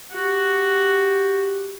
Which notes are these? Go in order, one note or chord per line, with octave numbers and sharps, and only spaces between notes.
F#4 G4